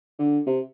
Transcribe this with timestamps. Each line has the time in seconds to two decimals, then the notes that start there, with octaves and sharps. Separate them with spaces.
0.19 D3
0.46 C3